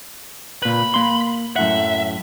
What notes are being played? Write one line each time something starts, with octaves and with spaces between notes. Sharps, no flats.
A#2 B4 B5
A#3 C6
F#2 A2 E5 F#5